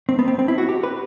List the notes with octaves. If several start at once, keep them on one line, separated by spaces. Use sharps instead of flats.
C4
B3
C4
C4
E4
F#4
G4
B4